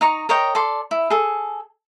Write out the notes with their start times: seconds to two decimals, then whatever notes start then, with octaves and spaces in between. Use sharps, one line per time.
0.01 D#4 A#5 C#6
0.29 A#4 C#5 D#5 G5
0.55 A4 D5 C6
0.91 E4
1.10 G#4 A4